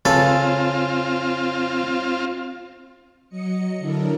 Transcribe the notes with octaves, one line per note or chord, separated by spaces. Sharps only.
C#3 C4 F4 A4 B4
F#3 D#5 C#7
D3 F#3 D4 E4 A4 A#4